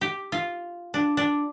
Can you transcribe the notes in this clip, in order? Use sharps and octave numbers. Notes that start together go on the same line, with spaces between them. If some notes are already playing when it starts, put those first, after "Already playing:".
G4
F4
D4
D4